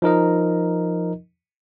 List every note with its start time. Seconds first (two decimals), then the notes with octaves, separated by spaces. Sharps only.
0.02 F3 D#4 A#4 D#5